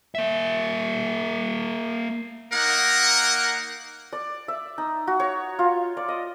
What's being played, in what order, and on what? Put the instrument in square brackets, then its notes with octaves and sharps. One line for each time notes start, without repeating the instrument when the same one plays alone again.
[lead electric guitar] A#3 E5
[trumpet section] A#3 D#4 A#4 F#5
[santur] D5
E5
D#4
F#4
C#5
F4
D5
D#5